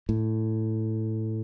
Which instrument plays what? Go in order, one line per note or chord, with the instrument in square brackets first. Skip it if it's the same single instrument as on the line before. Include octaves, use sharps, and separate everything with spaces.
[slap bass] A2